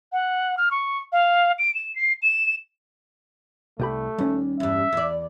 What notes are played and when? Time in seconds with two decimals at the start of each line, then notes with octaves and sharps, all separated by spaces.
0.12 F#5
0.57 F6
0.71 C#6
1.12 F5
1.59 D7
1.75 E7
1.96 C7
2.22 E7
3.80 C2 A3 G4 B5
4.18 D#2 G3 C#4
4.60 E2 G2 E5
4.93 E2 D5